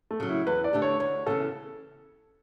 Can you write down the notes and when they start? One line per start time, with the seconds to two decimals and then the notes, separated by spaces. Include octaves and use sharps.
0.11 A3
0.20 C#3 F#3
0.29 E4
0.47 E2 B4
0.64 D5
0.73 D3 A3 D4 G4
0.82 C#5
1.00 D2 C#5
1.26 C#3 E3 B3 A4